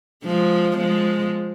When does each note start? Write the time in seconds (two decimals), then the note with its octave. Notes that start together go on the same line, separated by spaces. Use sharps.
0.24 F3 G#3
0.77 F3 G#3